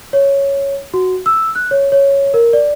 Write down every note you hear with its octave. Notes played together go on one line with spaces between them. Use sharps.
C#5
F#4
E6
F#6
C#5
C#5
A#4
D5